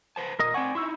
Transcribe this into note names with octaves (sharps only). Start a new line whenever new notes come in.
B4 C5 A5
A#2 A#4 D#5 D#6
C4 D5 F#5 G#5 C#6
D#4 E4 C6 C#6 E6